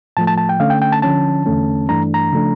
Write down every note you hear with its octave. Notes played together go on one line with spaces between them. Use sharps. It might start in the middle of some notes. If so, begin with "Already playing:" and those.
A2 F3 A3 A5
A5
A5
G5
D3 A3 C#4 F5
G5
G5
A5
D3 F3 C#4 A5
E2 D3 A3 C#4
G2 E3 A3 D4 A#5
A#5
C#3 F3 A3 D4